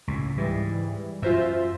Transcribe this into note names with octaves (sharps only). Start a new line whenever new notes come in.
C#2 A2
G#2 E3 G3
F#2 F4 C5 E5